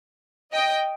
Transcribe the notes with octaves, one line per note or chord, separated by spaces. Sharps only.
D#5 G5